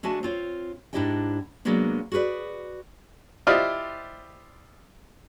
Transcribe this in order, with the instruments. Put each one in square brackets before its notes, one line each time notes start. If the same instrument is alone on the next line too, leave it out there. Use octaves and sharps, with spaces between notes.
[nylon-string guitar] D3 G#3 A3 F#4 G#5 A5
C4 F4 C#5
G#2 D4 E4 G4 D#5 G5
C3 F#3 G#3 A#3 B3 D4
F#4 G#4 A#4 B4 D5
[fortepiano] E4 F4 G4 C5 D5 D#5